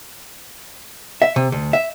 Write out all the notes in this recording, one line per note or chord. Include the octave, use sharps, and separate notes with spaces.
E5
C3
D2
E5